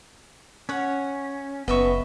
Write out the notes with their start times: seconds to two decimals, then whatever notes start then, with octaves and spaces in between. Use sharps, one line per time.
0.69 C#4 C#5 F#5
1.68 F#1 B3 D#5 E5 C#6